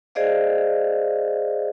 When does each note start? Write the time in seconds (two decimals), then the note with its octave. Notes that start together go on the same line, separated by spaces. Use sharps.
0.15 G#4 C5 D5 D#5 F5